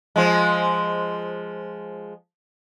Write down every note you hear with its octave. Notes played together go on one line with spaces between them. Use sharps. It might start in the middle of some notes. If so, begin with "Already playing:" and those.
F3 G#3